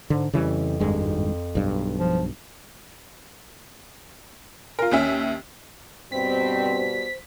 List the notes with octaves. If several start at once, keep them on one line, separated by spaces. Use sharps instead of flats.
G#2 D3
F2 C#3 E3 G3
G#1 G2 G#3
B1 G2
F3
F4 A#4
D#2 C#4 E5
G2 B2 G3 C4 C5 B6